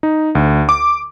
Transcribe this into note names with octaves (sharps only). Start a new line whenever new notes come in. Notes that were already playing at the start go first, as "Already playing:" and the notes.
D#4
D2
D6